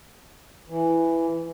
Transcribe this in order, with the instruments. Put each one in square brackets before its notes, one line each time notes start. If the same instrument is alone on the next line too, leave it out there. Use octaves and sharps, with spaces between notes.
[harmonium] E3